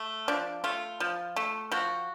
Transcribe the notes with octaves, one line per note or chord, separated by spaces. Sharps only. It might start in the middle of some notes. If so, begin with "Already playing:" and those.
Already playing: A3
F3 D4
A3 F4
F3
A3
F3 F#4